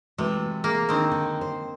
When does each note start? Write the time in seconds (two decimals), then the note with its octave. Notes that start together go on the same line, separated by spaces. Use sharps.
0.18 C3 E3 G#3 A3 F#4 B4
0.64 A#3 G#4
0.89 D#3 C4 D4 D#4
1.11 D3
1.41 C5